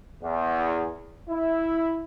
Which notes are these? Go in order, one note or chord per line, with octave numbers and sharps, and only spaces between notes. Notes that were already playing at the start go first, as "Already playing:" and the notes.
E2
E4